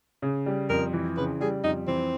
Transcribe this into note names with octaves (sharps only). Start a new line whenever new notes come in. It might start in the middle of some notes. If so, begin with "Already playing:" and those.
C#3
G3
F2 A#4
E3
C#3 B4
G3 G#4
F2 D#4
E3 C4